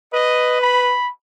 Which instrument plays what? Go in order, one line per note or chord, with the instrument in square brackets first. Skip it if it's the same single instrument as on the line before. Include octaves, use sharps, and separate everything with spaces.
[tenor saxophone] B4 [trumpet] D#5
[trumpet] B5